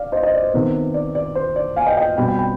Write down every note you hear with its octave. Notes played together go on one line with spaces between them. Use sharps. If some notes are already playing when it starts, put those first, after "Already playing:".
Already playing: D5 F5
C5 D#5
C5 D#5
D5
C5
C3 D#3 B3
D5
D5
C5
D5
F5 G#5
D#5 G5
D#5 G5
B2 G3 C4 G5 B5
G5 B5
G5 B5